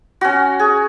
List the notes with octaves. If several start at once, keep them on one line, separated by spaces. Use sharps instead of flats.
C#4 F#4
G#4